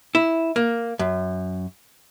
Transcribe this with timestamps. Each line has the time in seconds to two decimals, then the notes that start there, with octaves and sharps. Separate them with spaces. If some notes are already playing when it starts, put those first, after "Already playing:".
0.15 E4
0.56 A#3
0.99 F#2